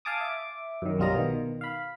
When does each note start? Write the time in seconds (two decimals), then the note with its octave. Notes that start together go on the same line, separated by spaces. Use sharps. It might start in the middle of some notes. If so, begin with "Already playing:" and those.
0.05 F5 G#5 A5 D6 D#6
0.21 E5 D6
0.82 F#2 D#3
0.98 B1 F#3 G3 F4 D#5 A#5
1.14 B2 D#3
1.61 F5 B5